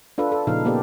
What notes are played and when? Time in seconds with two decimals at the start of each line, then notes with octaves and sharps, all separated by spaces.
0.18 D4 F4 A4 B4
0.32 A4
0.47 A#2 C#3 F3 D#4 F5
0.65 A#3 B3 G4 A4 D5